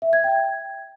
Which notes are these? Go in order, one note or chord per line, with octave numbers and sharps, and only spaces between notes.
E5
G#6
G5